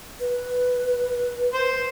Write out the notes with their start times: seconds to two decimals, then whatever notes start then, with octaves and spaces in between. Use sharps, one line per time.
0.20 B4
1.53 C5